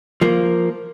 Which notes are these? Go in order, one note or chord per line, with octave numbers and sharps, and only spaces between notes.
F3 A#3